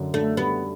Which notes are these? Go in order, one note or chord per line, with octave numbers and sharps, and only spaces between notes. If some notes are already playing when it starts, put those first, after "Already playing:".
Already playing: F#2 D3
A3 D4
G3 B3